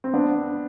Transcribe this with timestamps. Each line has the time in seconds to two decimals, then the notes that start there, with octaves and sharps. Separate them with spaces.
0.04 C4
0.14 B3 D4